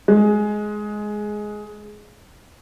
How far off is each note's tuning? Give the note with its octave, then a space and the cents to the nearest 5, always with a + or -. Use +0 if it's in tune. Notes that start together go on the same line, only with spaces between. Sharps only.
G#3 +10